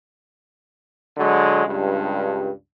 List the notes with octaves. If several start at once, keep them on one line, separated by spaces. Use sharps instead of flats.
D3 F#3 G#3
C#2 G2